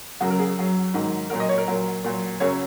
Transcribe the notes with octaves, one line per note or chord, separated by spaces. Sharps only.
F#2 C#3 F#3 F#4
A#4
G#4
F#2 F#3
G#2 D#3 F#3
A#2 F#3 A#4
D#5
C#5
A#4
A#2 F#3
A#2 F#3
F#2 C#3 F#3 C#5